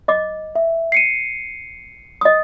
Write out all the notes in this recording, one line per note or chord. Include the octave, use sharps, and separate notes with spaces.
D#5 D6
E5
C7 C#7 D#7
D#5 D#6